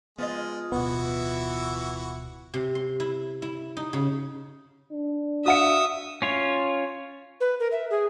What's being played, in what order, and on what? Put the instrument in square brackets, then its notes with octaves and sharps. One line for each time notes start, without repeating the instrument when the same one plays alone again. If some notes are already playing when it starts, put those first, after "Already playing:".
[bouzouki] F3 F4 D#5 [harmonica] G#3 [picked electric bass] B3
[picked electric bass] D1 B2 [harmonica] E3 E4 F#4 [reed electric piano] B3
[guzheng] C3
C6
E4
E4
D#4
C#3
[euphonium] D4
[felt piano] F#4 F5 C#7 [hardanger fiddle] E5 [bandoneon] D#6
[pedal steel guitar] C#4 F4 C#5
[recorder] B4
A#4
E5
G#4